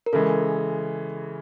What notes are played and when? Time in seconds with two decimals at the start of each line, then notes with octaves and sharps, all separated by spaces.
0.06 A#4
0.13 C#3 E3 G#3 A4